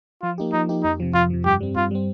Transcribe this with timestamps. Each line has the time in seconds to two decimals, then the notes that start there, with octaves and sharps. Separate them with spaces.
0.22 F3 F4
0.38 A#3 D#4 G4
0.53 F3 D#4
0.69 A#3 D#4 G4
0.83 F2 D#4
1.00 C3 F3
1.14 F2 F4
1.30 C3 F3
1.45 G2 G4
1.60 G3 C4
1.76 G2 F4
1.91 G3 C4